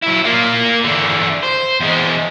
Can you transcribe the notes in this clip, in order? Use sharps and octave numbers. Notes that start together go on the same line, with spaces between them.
F#3 E4
A#3 F4
E2 D3
C5
E2 G#3